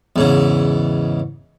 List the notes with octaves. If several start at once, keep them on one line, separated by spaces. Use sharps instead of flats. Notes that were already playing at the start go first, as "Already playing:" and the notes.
E2 G#2 C#3